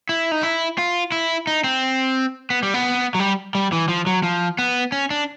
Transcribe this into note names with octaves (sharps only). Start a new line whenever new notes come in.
E4
D#4
E4
F4
E4
D#4
C4
B3
G3
B3
F#3
G3
G3
E3
F3
F#3
F3
B3
C#4
D4